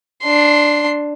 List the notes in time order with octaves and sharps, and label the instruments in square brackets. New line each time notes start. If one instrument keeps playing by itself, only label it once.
[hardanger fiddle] D4 C6